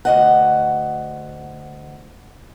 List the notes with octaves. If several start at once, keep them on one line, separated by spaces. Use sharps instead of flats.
D2 D#5 F#5